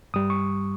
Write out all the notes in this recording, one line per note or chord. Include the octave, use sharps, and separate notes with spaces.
G2 G3 D#6
C#6